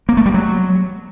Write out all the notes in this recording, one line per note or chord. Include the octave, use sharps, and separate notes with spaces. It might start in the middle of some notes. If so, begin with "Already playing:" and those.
A#3
A3
G3
F#3